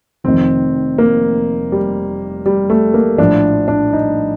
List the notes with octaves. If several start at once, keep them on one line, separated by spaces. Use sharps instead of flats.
F1 F2 D#3 C4
A#3
G3
G3
A3
A#3
A#1 A2 F3 D4
D4
D#4